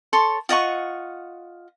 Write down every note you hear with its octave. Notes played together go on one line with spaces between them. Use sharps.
A4 C#5 C6
F4 D#5 F#5 C#6